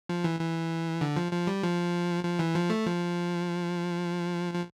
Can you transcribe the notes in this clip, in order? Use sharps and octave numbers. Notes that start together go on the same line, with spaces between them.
F3
E3
E3
D3
F3
F3
G3
F3
F3
E3
F3
A3
F3
F3